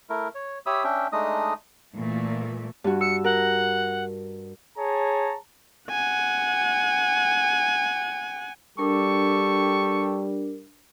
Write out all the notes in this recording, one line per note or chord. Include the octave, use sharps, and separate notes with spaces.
A3 E4 A#4
C#5
G4 C#5 E5 B5 D#6 E6
C#4 D4 E5 G5
G#3 A3 D4 D#4 D#5 D#6
A#2 E3 A3
G2 F#4
E6 C#7
A#4 F#5
G#4 C#5 A5 A#5
F#5 G#5
G3 D4 G4 A4 A#4 C#6